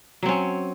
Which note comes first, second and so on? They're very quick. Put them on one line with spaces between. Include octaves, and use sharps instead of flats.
F#3 C4 C#4